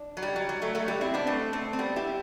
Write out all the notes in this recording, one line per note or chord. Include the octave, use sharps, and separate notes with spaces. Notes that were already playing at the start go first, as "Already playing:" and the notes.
Already playing: D4
F#3
G3
F#3
F#3
F#3 A3
F#3 A3
G3
C4 E4
B3 D4
A3 C4
A3 C4
C4
G3 B3
E4 G4